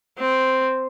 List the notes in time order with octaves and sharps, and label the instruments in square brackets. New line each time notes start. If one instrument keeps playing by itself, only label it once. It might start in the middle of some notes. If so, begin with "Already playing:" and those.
[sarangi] C4